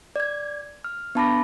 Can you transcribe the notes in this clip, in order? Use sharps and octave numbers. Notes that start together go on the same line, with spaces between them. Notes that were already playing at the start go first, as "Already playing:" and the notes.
D5 G#6
F6
B3 D4 A5 B5 D6 A#6